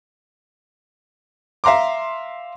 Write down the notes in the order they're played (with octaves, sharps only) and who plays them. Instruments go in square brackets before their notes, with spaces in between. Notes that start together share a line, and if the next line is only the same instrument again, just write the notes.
[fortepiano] E5 F5 A#5 C6 D6